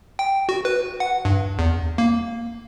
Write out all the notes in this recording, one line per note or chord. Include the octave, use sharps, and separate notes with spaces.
G5
F#4
B4
F#5
G2
E2
A#3